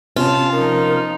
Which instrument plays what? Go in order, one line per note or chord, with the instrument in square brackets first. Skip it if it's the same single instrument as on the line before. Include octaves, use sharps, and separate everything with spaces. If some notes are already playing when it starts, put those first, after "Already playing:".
[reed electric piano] C3 B3 C#4 [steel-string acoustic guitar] F4 [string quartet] A5
[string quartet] F3 D#4 [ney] A#4